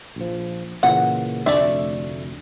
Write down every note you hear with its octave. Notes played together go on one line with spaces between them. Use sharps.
A#1 F3
A#2 C#3 E3 F#5
F1 D2 A3 D4 D5 E5